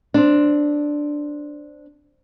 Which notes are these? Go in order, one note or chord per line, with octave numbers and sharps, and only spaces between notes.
C4 D4